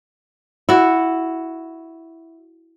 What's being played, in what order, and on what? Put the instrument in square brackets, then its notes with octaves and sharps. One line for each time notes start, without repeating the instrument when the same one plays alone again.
[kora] E4 F#4